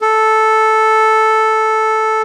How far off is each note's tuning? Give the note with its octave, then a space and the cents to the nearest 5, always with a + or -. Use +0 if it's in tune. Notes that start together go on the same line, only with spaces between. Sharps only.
A4 -5